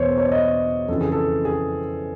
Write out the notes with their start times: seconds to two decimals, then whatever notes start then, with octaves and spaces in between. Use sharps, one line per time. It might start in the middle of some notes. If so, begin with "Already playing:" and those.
Already playing: E2 B2 C5 C#5
0.10 C5
0.18 C#5
0.25 D5
0.32 D#5
0.88 F2 C#3 E3 A4
1.01 G#4
1.12 A4
1.45 G#4